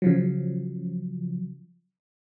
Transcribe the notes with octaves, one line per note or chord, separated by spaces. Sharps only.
C#3 F3 F#3